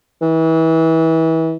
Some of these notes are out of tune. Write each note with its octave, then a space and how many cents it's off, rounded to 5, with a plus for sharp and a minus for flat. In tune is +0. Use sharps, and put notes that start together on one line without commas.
E3 -30